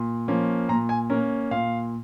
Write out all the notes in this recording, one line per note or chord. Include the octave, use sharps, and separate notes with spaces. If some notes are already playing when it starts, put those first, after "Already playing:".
Already playing: A#2
F3 A#3 C#4
A#2 A#5
G#5
A#3 C#4 A#4
A#2 F5